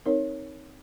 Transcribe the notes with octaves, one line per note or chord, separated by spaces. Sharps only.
C4 D#4 A#4 C#5